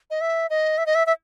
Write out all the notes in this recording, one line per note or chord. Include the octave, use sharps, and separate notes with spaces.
D#5
E5
D#5
E5
D#5
E5
E5